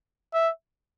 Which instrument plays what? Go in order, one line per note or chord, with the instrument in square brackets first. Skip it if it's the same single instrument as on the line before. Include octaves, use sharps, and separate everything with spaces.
[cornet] E5